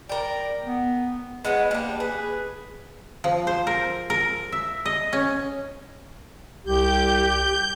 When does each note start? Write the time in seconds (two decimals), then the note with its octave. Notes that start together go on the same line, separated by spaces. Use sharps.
0.09 A#4 D5 G5
0.64 B3
1.45 G#3 B3 C#4 B4
1.71 G3 A#3 D4
2.00 G#4 B4
3.24 F3
3.47 C5
3.67 A#4
4.10 A#4
4.52 E5
4.86 D#5
5.13 C#4
6.65 C2 G4 G6